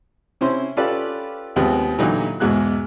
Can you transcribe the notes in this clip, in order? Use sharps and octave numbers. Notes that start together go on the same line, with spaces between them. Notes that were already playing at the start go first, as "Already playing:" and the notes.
C3 C#4 E4 C5 C6
C#4 F4 G4 A4 B4 D5
D#2 C3 F3 G#3 B3
A#2 D3 E3 F#3 D#4 G4
E2 G#2 B2 G#3 F#4 F#6